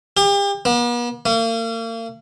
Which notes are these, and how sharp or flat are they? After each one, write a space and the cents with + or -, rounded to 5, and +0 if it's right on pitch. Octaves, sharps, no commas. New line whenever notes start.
G4 +40
B3 -45
A#3 -40